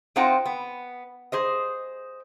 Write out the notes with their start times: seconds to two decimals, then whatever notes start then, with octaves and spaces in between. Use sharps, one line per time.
0.16 C4 D#4 F4 C5 F#5 G5
0.46 B3
1.32 G#4 C5 D#5